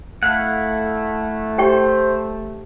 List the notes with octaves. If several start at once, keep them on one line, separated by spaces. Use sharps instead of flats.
A3 E4 F5 F#5
G4 C5 G5 C#6